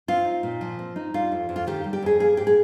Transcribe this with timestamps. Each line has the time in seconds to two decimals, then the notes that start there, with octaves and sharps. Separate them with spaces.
0.08 C4 F4
0.25 D#4
0.43 A#2
0.61 F3
0.79 C4
0.96 D#4
1.14 G3 F4
1.32 F2
1.49 F2
1.56 F4
1.67 D#3 G4
1.84 G3
1.93 G4
2.02 F2 G#4
2.20 A#3 G#4
2.37 G#2 G4
2.47 G#4